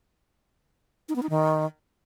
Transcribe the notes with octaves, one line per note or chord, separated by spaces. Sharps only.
D#4
B3
D#4
D#3